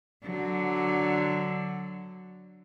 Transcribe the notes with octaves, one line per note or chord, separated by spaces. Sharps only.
D3 F#3